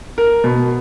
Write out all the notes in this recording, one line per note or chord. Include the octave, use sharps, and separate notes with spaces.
A#4
B2